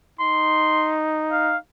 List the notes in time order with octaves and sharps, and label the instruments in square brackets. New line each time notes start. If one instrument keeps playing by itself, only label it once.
[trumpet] D#4 [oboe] C6
[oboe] F5